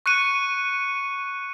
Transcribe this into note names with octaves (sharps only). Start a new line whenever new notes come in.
C#6 F#6 C#7 D#7